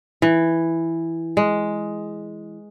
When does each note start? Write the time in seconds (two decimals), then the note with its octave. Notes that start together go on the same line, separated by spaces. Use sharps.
0.22 E3
1.37 G#3